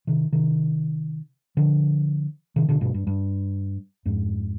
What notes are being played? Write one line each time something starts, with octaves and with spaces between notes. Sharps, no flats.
C3 D#3
C3 D#3
D3 F3
C3 D#3
B2 D3
G2 B2
G2
G2
F2 G#2